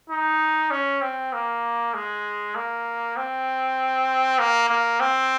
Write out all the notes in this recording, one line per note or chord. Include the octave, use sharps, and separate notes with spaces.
D#4
C#4
C4
A#3
G#3
A#3
C4
A#3
A#3
C4